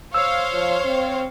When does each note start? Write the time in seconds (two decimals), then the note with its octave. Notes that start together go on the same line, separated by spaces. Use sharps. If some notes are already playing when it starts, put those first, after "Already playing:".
0.14 C5 C#5 F5 E6
0.53 F3
0.85 C4